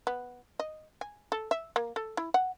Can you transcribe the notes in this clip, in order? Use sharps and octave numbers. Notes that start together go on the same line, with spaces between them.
B3
D#5
G#5
A4
E5
A#3
A4
E4
F#5